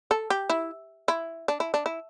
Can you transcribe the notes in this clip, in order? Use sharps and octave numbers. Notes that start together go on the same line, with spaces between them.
A4
G4
E4
E4
D4
E4
D4
E4